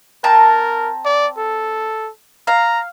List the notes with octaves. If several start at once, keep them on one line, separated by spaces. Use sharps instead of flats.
C4 A#4 A5 A#5
D5
A4
F5 A#5